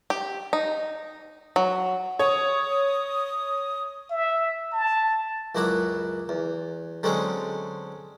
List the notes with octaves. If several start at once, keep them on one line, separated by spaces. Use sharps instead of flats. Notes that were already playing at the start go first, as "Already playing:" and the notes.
G4
D#4
F#3
C#5 D#6
E5
A5
C#2 F#2 F#3 E4 F#4 D6
E2
D3 F#3 G#3 C4 C#4 G#4